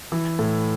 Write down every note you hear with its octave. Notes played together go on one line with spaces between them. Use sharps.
E3
A2